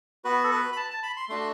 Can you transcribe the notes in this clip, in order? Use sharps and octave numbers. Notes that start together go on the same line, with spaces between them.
B3 F#4 B4
A4
B4
B5
A5
A5
B5
C6
A3 D4 F#4 C6